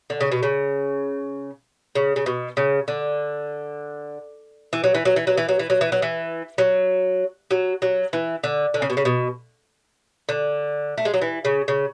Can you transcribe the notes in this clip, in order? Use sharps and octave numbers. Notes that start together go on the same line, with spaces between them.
D3
C#3
B2
C#3
C#3
C#3
B2
C#3
D3
E3
F#3
E3
F#3
E3
F#3
E3
F#3
E3
F#3
E3
F#3
E3
F#3
F#3
F#3
E3
D3
D3
C#3
B2
C#3
B2
D3
A3
G#3
F#3
E3
C#3
C#3